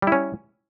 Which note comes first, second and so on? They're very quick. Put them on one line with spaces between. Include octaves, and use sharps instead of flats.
G3 E4 C#4